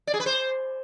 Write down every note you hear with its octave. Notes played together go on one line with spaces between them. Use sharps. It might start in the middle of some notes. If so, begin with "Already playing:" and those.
D5
G#4
B4
C5